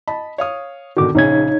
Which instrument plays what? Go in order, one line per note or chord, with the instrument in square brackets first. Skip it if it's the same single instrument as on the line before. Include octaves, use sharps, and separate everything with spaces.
[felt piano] D#5 A5 B5
C#5 F5 D#6
[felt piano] B2 D3 D#3 [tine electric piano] F#4 D6
[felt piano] A#1 C#3 G#4 [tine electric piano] D#4 C#5 G#6